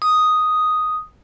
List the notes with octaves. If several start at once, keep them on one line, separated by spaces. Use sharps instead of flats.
D#6